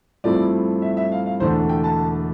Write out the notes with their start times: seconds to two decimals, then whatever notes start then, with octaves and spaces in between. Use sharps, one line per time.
0.24 G2 F3 A3 C4 E4 D5
0.82 E5
0.97 E5
1.12 F5
1.26 F5
1.40 E1 E2 D3 A3 D4 C5
1.69 G5
1.84 A5